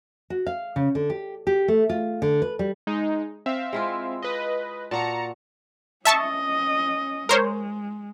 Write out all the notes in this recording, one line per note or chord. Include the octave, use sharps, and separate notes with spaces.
F#4
F5
C#3
D3
G4
G4
A3
F4
D3
B4
G3
G#3 D#4
C4 E5 F5
G#3 E4 F4
B4 D#5
A#2 F#4 A5 A#5 C#7
C#4 D#5 E5 A5 C#6
G#3 A#4 C5 C#5